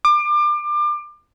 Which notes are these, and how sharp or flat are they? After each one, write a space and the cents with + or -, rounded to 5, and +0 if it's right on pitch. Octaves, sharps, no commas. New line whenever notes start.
D6 +30